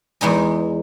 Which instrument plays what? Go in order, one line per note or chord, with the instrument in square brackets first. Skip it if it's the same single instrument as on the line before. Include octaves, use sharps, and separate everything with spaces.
[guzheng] E2 G#3 D#4 G#5